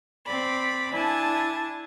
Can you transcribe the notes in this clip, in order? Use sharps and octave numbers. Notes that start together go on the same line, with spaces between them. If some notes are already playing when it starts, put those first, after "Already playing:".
C4 D5 B5
D4 E4 G#5 A5